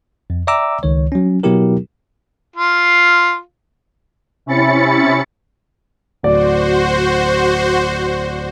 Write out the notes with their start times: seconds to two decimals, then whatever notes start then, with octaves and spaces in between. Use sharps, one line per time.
0.30 F2
0.47 D5 E5 G5 A#5 D6 E6
0.83 C#2 D#3 C#5
1.12 F#3 C#4
1.43 B2 F#3 B3 E4 G4 A#4
2.56 F4
4.46 C3 C#4 E4 B5 A6 C#7
6.23 D1 F#4 C5 D5